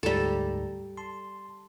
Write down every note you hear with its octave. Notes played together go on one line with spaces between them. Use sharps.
D2 G#2 G3 A4 A#5
A5 C6